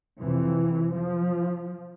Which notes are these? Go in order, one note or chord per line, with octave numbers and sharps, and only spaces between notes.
F2 C3 E3
F3